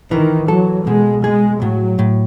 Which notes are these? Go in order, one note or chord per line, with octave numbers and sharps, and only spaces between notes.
D#3 E3
F#3 A4
B2 G#3
G#3 G#4
A2 F#3
A2